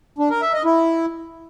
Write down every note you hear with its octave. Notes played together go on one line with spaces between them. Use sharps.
D4
A#4
E5
D#5
E4